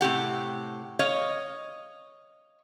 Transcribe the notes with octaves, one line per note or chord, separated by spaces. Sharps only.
A2 C3 G4 F#5
C#5 D#5 F5